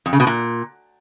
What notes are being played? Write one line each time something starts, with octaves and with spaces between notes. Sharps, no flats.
F2
C#3
B2
A#2